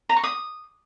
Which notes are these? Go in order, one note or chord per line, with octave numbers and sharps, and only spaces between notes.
A#5
C#6
D#6